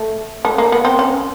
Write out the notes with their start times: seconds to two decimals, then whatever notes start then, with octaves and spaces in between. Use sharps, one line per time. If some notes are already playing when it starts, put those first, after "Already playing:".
Already playing: A3
0.45 A3
0.58 A#3
0.72 B3
0.85 C4
0.99 C#4